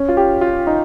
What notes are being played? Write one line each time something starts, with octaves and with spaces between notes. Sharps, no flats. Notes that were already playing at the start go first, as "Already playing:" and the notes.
Already playing: C#4
F4
G4
F4
D#4